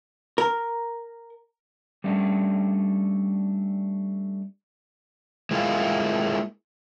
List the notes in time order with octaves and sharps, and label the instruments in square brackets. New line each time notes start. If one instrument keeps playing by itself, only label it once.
[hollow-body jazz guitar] A#4
[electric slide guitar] G3 A3 C#4 D4
G#3 A#3 E4 F4